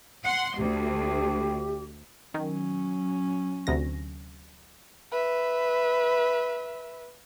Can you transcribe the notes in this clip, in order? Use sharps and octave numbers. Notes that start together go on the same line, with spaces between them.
F#5 C6
D2 G4
D#3 F#3 C#4
D2 C3 A#6
B4 E5